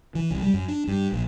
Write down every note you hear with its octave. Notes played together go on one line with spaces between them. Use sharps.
E3
C2
G3
F#2
D4
G2
A#1